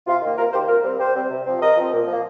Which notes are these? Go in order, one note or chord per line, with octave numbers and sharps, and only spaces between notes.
C3 F4
D#3 A#3
C3 F4 A#4
D#3 A#3 G4 C5
C3 F4 A#4
G3 C4
C3 G4 C5
G3 C4
C3
F3 C4
C3 A#4 D#5
F3 C4
A#2
F3 A#3